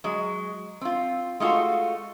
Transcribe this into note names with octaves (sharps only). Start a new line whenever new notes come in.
F#3 G#3
C4 F4
G#3 A3 F4 F#4 A4